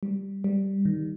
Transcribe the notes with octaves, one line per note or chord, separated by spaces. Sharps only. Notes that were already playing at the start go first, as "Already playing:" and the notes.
G3
G3
D#3